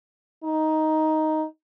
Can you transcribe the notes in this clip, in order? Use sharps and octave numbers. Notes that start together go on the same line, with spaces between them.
D#4